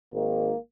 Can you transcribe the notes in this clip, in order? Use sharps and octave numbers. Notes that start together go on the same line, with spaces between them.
G#1 G#2 D#3 A#3